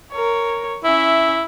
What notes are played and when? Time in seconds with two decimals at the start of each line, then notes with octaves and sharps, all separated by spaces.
0.11 A#4 C#5
0.84 C#4 E4 E5